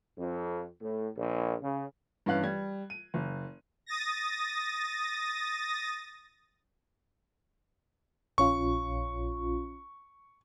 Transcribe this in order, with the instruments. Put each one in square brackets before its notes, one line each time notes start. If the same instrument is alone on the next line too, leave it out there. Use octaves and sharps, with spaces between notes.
[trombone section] F2
A2
A#1
C#3
[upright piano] G2 E3 C#4 F5 F#6
G3 G#6
D#7
F#1
[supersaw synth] D#6 A6 A#6
[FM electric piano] A#1 C#4 F4 [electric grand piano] C#6